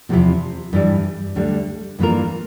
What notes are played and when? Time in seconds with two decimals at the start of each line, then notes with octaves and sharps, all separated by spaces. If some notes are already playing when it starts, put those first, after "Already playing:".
0.09 E2 C3 F3 C4 E4
0.73 G2 E3 G3
1.35 D2 D3 G3
1.99 G2 E3 A#3 F4 A#4